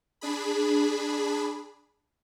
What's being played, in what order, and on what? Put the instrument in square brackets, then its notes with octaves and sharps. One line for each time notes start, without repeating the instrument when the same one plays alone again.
[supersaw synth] D4 G#4 B5